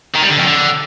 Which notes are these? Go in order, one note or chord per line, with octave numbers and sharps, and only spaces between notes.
D#3
G3
D3
F2
D3